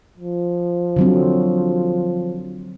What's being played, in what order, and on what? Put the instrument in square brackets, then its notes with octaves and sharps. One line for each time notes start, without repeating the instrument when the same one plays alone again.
[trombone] F3
[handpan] D3 F#3 C4